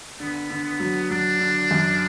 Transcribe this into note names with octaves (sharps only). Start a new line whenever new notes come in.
D3 B3
D3
B3
F#3
F#3 D4
D3
F#2